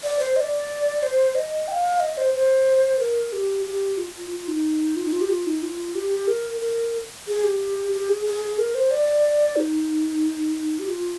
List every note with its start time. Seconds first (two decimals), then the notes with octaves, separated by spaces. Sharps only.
0.03 D5
0.19 C5
0.36 D#5
0.41 D5
1.03 C5
1.35 D#5
1.68 G5
1.71 F5
2.00 D#5
2.18 C5
2.34 C5
2.99 A#4
3.33 G4
3.66 G4
3.97 F4
4.31 F4
4.48 D#4
4.96 F4
5.05 D#4
5.12 F4
5.21 G4
5.29 F4
5.47 D#4
5.62 F4
5.95 G4
6.28 A#4
6.61 A#4
7.27 G#4
7.44 G4
7.92 G4
8.09 G#4
8.26 G#4
8.58 A#4
8.75 C5
8.91 D5
9.56 D#4
10.79 G4
10.88 F4